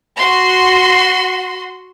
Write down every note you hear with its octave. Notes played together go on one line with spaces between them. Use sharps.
F#4 C6